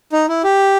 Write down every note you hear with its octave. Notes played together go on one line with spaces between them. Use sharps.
D#4
E4
G4